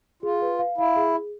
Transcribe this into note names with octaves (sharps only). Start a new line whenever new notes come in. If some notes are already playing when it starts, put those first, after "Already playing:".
F4 G#4
B4
F5
E4 F5
G#4
G#4